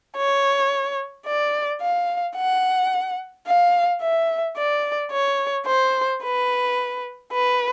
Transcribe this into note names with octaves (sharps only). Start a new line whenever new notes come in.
C#5
D5
F5
F#5
F5
E5
D5
C#5
C5
B4
B4